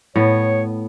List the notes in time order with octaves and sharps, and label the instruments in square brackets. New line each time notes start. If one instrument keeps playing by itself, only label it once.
[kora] A2 B3 [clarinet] C#5